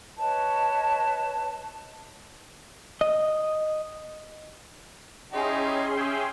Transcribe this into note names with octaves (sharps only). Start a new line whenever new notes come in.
B4 C#5 D#5 A5
D#5
C#4 D#4 E4 G4 G#4 C6
G4 E5 G5